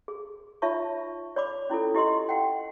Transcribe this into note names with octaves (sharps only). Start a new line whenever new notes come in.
G#4
D#4 F4 C#5 E5 A5 C#6
C#5 D5 B5 D6
C#4 E4 F4 A4
E4 G4 D#5 C6
F#5 G5